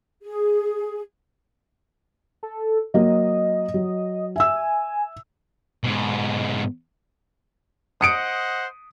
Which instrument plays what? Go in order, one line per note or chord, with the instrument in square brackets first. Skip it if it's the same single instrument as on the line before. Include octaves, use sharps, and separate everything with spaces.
[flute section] G#4
[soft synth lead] A4
[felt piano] F#3 A#3 [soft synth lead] D#5
[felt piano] F#3
[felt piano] E5 E6 [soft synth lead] G#5
[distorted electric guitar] G#2 B2
[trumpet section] C5 D#5 F#5 [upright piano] D#6 C#7 D7